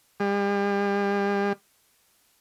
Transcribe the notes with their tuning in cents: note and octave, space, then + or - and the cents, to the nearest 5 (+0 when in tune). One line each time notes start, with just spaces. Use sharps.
G3 +40